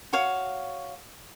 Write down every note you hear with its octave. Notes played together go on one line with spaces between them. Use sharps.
F#4 C#5 F5